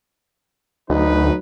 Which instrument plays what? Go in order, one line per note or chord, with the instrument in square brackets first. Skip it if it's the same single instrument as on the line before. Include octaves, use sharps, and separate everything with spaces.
[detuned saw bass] D2 [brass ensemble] F#3 D#4 B4